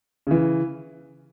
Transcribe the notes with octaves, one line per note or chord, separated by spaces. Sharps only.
C#3 E3